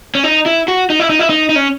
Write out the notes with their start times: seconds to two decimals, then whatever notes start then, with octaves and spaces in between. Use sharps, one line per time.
0.15 C#4
0.24 D#4
0.46 E4
0.68 F#4
0.90 D#4
1.00 E4
1.10 D#4
1.19 E4
1.30 D#4
1.49 D#4
1.56 C#4